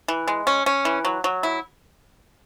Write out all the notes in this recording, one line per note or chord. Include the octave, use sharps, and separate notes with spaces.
E3
G#3
C#4
C#4
E3
F#3
F#3
E4